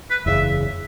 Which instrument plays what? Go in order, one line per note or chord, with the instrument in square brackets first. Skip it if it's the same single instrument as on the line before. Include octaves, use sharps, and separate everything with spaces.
[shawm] B4
[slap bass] F#1 E2 C#3 [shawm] E5